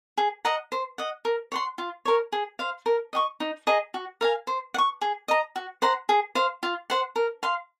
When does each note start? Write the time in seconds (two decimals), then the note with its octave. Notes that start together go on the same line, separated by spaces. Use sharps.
0.18 G#4
0.45 D#5 F#5 A#5
0.72 C5
0.98 D#5 F#5
1.25 A#4
1.52 C#5 F#5 C6
1.78 F4
2.05 A#4 C#5
2.32 G#4
2.59 C5 F5
2.86 A#4
3.13 D#5 F#5 C#6
3.40 D#4
3.67 G#4 D#5 A#5
3.94 F#4
4.21 A#4 F5 G#5
4.47 C5
4.74 F#5
4.78 C#6
5.01 G#4
5.28 D#5 A#5
5.56 F#4
5.82 C5 F#5 A#5
6.09 G#4
6.35 C5 F5
6.63 F4
6.90 C5 F#5
7.16 A#4
7.43 F5 C6